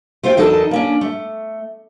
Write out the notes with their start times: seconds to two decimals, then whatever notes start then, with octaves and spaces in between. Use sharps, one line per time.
0.23 A3 F4 C5 E5 G5
0.37 E2 F#3 D#4 A4 A#4 A5
0.71 A#3 C#4 D4
1.01 A3